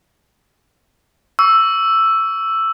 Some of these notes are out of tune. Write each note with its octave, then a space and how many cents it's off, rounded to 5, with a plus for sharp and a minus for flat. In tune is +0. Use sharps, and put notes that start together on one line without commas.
C#6 +40 E6 +5